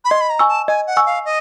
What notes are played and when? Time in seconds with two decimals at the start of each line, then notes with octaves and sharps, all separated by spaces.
0.05 B5
0.11 D#5 C6
0.21 B5
0.30 A#5
0.39 G#5 C#6 E6
0.49 A5
0.68 D#5 G#5
0.87 F#5
0.97 G#5 C#6 E6
1.06 F5
1.25 D#5